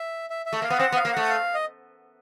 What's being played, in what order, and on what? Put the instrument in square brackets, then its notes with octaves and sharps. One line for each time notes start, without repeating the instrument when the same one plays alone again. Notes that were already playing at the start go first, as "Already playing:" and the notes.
Already playing: [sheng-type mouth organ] E5
E5
E5
[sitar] A3
[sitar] A#3 [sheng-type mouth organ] F5
[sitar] B3
[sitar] C4 [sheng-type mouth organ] F#5
[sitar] B3
[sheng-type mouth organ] F5
[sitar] A#3
[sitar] A3 [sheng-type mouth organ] F#5
[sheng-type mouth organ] F5
D#5